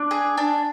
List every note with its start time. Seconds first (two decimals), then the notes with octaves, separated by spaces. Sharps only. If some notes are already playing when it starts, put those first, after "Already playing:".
Already playing: D4 D5
0.11 G#4
0.37 D4